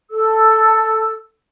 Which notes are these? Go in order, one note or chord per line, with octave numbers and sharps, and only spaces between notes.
A4 E6